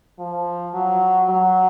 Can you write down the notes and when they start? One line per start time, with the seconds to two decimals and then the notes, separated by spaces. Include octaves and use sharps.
0.19 F3
0.74 F#3
1.30 F#3